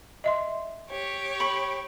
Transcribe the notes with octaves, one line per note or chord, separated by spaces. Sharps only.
D#5 E5 C6
G4 C#5
B5 C#6